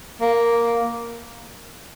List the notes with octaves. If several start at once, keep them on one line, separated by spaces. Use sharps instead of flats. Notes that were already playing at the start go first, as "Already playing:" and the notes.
A#3